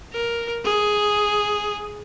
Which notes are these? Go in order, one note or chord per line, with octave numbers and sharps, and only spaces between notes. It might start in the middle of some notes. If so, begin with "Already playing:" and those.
A#4
G#4